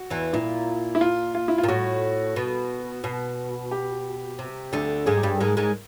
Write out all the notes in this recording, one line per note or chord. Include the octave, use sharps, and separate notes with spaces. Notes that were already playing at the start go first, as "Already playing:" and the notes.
Already playing: F#4
E2 E3
A#2 E4
E4
F4
F4
E4
F4
A#2
A2 F#4
B2
B2
G4
C3
D2 D3
G#2 G#3 G#4
G4
G2 G3 G#4
A4
G#2 G#3 A#4
G#2 G#3